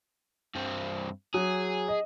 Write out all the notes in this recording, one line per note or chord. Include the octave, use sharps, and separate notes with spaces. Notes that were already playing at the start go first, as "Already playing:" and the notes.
G2 C4
F#3 G#4
D#5